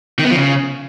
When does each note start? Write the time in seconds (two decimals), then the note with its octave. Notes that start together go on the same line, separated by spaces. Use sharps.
0.19 D#3
0.25 B3
0.30 F3
0.36 C#3